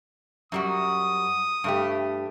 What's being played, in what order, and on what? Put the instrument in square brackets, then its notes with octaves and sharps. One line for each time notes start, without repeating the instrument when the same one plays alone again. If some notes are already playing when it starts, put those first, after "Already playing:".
[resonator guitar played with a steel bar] F#2 G3 F#4 [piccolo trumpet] D#6
[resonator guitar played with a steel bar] G2 A3 G4